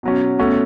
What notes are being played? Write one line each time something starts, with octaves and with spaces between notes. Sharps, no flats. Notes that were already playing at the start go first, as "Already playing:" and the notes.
B2 F#3 C#4
B2 A3 C#4 F#4